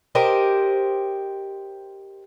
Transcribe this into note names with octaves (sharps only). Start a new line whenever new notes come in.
G4 A#4 C5 D#5